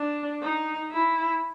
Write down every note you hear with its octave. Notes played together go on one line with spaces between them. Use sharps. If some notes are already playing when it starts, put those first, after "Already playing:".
Already playing: D4
D#4
E4